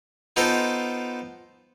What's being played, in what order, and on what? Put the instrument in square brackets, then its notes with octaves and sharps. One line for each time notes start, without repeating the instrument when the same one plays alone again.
[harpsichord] B3 D#4 F4 A4 C5 G5